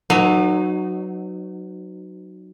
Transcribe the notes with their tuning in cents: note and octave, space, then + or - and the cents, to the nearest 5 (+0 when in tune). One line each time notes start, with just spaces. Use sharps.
F#3 +0 D#4 -30 B4 +35